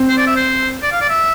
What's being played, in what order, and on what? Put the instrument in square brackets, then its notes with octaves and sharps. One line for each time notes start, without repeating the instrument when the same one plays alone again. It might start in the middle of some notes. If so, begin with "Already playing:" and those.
Already playing: [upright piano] C4
[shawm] C5
D5
E5
C5
D5
F5
D5
E5